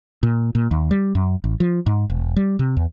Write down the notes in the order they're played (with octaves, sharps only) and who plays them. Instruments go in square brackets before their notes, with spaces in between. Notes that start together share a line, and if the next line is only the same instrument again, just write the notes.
[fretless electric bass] A#2
A#2
D#2
G3
F#2
A1
F3
G#2
E1
G3
C3
E2